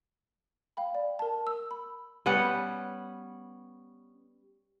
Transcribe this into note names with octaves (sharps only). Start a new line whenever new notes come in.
F5 G5 B5
D5
A#4 A5
E6
B5
G3 B3 C#4 F#5